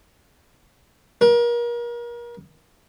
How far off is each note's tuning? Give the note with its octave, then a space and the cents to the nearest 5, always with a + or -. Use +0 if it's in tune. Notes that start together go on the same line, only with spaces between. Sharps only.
A#4 +35